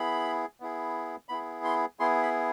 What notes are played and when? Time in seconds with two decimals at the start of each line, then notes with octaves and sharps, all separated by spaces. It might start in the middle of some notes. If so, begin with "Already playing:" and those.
Already playing: B3 E4 G#4 B5
0.60 B3 E4 G#4
1.29 B3 E4 G#4 B5
1.64 C6
1.99 B3 E4 G#4 C6
2.23 B5